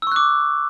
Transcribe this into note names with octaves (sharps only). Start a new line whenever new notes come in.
C#6 D6 E6 F#6